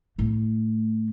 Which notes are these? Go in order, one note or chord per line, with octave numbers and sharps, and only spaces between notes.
A2 A3